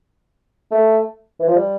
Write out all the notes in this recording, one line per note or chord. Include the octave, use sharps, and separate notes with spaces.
A3
E3
F3
G3